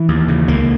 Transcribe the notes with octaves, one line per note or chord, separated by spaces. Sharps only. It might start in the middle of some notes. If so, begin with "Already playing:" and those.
Already playing: E3
D#2
C#3
C#2 A#3